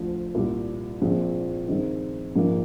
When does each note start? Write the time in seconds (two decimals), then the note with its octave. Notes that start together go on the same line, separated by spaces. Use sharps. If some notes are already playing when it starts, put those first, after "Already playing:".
Already playing: D2 D3 F3
0.35 C2 A#2 G3
1.01 A#1 A#2 F3 G#3 C4
1.68 G2 D#3 G#3 C4 D#4
2.36 A#1 G#2 F3 A#3